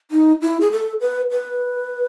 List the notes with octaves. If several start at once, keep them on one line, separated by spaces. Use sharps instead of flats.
D#4
E4
G#4
A4
B4
B4